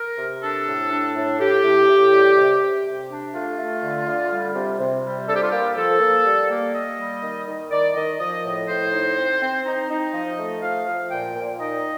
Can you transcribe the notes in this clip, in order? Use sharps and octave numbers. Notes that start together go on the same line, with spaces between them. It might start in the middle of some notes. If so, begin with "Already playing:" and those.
Already playing: A#4
C3
D4 A4
A2
D4
A2
A2 G4
A2
A2
G3
C3
C3
C3
D4
A3 F4
A3
D3
D3
G3
C3
C3
G3
D4 A4
G4
F4
A#3 G4
F3 A4
A#3
G3
A#3
A#3 D#5
G3
D#3
D#3
D#3 D5
D#3 D#5
F3 D#5
A2
A2 C5
D#4
C4
C4
D#4
D#4
F3 D#5
A3
F3 F5
F3
A#2 G5
A#2
D#4 D#5